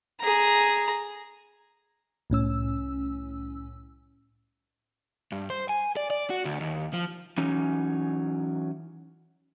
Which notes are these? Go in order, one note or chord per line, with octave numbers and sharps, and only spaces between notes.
G#4 A#5
C2 A2 C#4 E6
G2
C5
G#5
D5
D5
F#4
D2
D#2
F3
E3 F#3 C#4 D#4